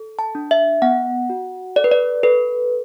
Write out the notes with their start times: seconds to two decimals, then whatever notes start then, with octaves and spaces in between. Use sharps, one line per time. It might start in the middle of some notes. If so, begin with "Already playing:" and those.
Already playing: A4
0.19 A5
0.35 D4
0.51 E5
0.82 B3 F#5
1.30 F#4
1.76 A4 D5
1.84 B4
1.91 D5
2.23 A4 B4